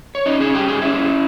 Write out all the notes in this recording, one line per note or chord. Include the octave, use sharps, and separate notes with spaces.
C#5
C#4 D#4 D#5
G#4 G#5
G2 G4 G5
G#4 G#5
C#4 E4 E5